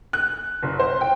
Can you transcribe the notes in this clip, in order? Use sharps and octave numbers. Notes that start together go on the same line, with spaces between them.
F#6
F#1
C5
G5